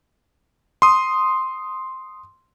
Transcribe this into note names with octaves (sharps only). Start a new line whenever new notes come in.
C6 D#6